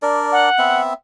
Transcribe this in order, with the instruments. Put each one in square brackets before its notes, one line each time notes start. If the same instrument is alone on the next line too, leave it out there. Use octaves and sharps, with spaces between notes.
[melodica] D4 A#4 D5
[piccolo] F#5
[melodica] B3 C4 E5